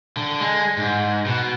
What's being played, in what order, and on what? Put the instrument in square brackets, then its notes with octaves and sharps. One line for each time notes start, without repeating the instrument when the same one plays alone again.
[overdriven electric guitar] D3
G#3
G#2
B2